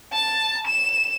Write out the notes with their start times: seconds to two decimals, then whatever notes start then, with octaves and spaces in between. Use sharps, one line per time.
0.13 A5
0.67 E7